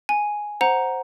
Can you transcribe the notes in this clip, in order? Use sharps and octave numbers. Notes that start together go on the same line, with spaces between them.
G#5
C5 F#5 A#5